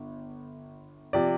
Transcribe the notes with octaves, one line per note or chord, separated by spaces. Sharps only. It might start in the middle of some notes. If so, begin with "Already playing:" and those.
Already playing: G1
C3 F3 D5